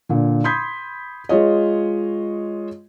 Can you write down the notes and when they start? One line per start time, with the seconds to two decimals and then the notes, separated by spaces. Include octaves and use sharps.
0.09 A#2 D3
0.44 B5 C6 D#6 G6 G#6 B6
1.29 G#3 F4 C#5 D#5